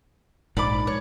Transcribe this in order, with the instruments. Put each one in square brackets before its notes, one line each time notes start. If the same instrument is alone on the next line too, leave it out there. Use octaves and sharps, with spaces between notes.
[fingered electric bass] A#1 G#2 [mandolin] D5 B5 D6
[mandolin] C#5